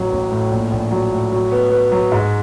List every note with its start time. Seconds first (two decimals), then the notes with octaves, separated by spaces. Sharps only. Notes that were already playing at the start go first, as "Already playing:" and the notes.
Already playing: A1 F#3
0.12 A1
0.32 A2
0.51 A#1
0.71 A#1
0.91 F#3
1.12 A2
1.32 F#3
1.52 B3
1.72 B3
1.92 F#3
2.12 G#2